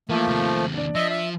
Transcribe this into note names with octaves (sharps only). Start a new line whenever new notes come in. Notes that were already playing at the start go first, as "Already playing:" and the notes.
E3 F3 A3 A#3
D#2 C3
D4 D5
F3 D#5 E5
E5